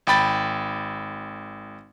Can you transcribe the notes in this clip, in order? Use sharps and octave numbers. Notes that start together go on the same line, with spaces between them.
G#1 G5 B5 A6